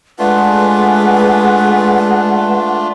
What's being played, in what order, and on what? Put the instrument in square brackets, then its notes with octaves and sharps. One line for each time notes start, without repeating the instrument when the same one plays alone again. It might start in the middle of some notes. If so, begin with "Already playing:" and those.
[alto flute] G#3 [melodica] A3 D4 F4 [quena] B4 [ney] F#5